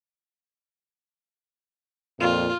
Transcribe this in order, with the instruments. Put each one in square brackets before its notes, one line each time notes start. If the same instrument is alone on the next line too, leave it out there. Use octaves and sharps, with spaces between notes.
[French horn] F2 [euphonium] A#2 [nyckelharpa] F4